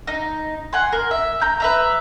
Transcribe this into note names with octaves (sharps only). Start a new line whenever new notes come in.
D#4
F#5 G#5 C6
A#4
E5
A#5 G6
B4 E5 A#5